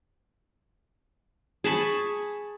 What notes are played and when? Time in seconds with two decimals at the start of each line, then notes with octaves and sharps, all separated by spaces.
1.64 G#4 A5 B5 C#6